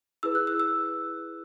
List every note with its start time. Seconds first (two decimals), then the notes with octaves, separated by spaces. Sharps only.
0.23 E4 G#4 B4 E6
0.35 F#6
0.47 E6
0.60 E6